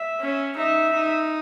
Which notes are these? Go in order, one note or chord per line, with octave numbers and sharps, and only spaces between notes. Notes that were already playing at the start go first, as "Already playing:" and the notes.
Already playing: E5
C#4
D#4 E5
D#4